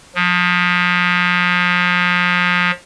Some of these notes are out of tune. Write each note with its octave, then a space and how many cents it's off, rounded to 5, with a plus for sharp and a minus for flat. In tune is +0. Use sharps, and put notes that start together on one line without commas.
F3 +30